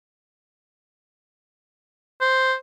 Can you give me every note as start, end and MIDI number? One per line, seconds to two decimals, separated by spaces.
2.21 2.55 72